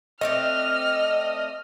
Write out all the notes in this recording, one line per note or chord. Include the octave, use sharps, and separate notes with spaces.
A3 C4 D4 D#5 F6